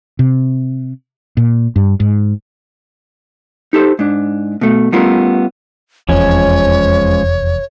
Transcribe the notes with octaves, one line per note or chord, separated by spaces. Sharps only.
C3
A#2
G2
G#2
D#4 G4 A4 C5
G#2 D4
B2 A3
G3 A3 B3 C#4 F4 A#4
F1 E2 F3 G#3 C#4 C#5